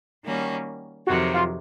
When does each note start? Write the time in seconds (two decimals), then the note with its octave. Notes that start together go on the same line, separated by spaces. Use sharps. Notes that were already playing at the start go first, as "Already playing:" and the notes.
0.24 D#3 G3 A#3 C#4 F#4
1.07 F2 C3 D#3 F#3 F#4
1.34 F4